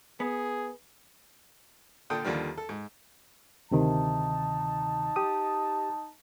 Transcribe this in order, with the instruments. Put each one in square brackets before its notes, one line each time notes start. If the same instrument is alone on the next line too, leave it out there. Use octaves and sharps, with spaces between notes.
[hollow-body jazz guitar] B3 [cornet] G#4
[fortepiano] A#2 D3 A4 G5 D#6
D#2 D3 D#3 F3 G3
A4
G#2
[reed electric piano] D2 C3 D#3 [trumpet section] D#4 A5
[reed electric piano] G4 D#6